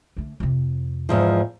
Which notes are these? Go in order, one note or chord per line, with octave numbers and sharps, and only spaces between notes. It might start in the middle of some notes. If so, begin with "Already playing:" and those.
D3 A3
F2 C3
E2 G#2 F3